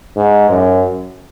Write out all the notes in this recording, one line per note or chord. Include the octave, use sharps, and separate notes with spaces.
G#2
F#2